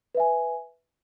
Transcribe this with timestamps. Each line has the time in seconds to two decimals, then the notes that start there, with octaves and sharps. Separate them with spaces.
0.15 B4
0.17 E5
0.20 G#5